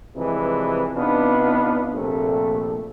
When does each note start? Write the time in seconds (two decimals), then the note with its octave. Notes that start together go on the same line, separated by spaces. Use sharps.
0.16 C3 E3 F3 G3 G#3 B4
0.97 C3 B3 D4 D#4 F4 B4
1.93 A#1 C3 A3